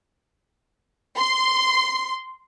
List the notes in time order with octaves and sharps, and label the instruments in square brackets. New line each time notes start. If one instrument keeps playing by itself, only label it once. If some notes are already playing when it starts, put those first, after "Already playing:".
[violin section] C6